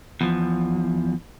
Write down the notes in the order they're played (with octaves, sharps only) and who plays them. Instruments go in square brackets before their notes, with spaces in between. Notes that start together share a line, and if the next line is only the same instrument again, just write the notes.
[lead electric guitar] E2 F3